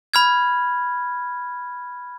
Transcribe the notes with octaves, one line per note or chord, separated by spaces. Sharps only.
B5 F6 G#6